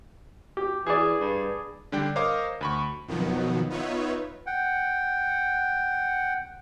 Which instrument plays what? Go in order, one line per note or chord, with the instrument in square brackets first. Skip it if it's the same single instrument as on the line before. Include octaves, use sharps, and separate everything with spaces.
[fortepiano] G4
[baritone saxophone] E3 [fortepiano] G#4 D5
[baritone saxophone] G2
[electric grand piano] D3 G3 D4 G5
A#4 C5 C#5 D#5 F5 D6
D2 B5 C#6
[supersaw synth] F2 B2 D#3 F3 F#3 B3
B3 D#4 F4 B4 C#5 E5
[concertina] F#5 G5